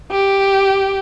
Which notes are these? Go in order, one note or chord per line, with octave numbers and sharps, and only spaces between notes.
G4